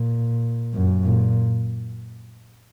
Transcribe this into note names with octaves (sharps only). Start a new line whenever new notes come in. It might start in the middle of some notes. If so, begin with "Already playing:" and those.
Already playing: A#2
F#2
A#2